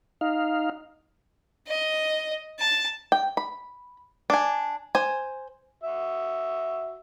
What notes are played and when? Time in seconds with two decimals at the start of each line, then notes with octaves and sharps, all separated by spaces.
0.21 D#4 F5
1.67 D#5
2.59 A5
3.12 G5
3.37 B5
4.30 D4 G#5
4.95 C5 G#5
5.83 F#4 E5